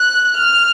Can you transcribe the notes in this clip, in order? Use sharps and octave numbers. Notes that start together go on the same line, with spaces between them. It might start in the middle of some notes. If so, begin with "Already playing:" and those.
Already playing: F#6
F6